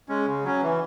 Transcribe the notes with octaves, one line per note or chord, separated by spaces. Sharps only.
G#3 C#4
C#3
F#3 C#4
E3